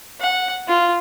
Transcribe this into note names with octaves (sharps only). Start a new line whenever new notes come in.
F#5
F4